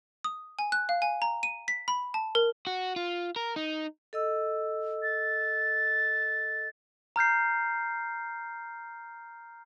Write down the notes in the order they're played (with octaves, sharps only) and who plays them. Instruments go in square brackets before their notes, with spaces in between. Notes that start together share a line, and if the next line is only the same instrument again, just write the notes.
[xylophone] D#6
G#5
F#6
F5
G#5
A#5
D#7
B6
B5
A5
A#4
[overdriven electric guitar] F#4
F4
A#4
D#4
[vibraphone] A4 D#5 E6
[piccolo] A6
[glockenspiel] A#5 F6 G6 C7